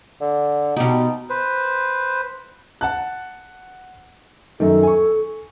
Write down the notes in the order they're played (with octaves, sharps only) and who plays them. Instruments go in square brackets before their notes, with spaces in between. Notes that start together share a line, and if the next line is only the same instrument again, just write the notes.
[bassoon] D3
[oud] B2 G4 [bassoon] D#4
[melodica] B4 C5
[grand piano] F#5 A5 F#6
[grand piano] F#2 D#3 [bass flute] A4
[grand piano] G#5 C#6